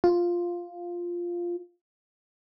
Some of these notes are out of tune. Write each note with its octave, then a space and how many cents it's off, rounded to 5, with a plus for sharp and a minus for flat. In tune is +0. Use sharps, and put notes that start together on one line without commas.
F4 +0